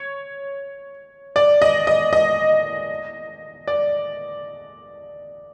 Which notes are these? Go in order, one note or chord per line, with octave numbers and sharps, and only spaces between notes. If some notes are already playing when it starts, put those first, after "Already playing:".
Already playing: C#5
D5
D#5
D#5
D#5
D5